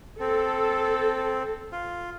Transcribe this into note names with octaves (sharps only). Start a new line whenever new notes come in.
C4 A4
F4